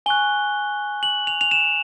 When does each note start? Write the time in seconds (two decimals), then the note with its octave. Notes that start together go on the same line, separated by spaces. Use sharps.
0.06 G#5 C#6 F#6 G7
1.03 F#7
1.27 F7
1.41 F7
1.51 E7